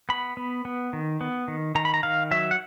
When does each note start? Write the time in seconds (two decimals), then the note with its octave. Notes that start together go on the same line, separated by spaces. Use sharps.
0.09 B3 B5
0.37 B3
0.65 B3
0.93 D#3
1.21 B3
1.48 D#3
1.75 D#3 A#5
1.85 B5
1.94 A#5
2.03 D#3 F5
2.31 F#3 E5
2.51 F#5